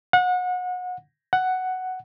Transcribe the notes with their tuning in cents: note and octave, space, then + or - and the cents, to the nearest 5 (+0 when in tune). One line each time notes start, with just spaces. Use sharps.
F#5 -30
F#5 +5